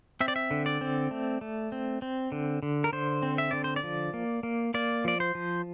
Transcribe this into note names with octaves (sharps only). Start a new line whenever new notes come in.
C4 E5
D5
E5
D3
D5
C4
A3
A3
C4
C4
D3
D3
A#4
D3 C5
C4
E5
D3 D5
C5
D5
F3
A#3
A#3
A#3 D5
F3 D5
C5
F3